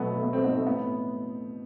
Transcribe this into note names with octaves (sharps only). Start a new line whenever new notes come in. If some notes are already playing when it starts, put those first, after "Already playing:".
Already playing: B2 F#3 A3 B3
A3
B3
A3 C4
B3 D#4
A3 C4
A2 B3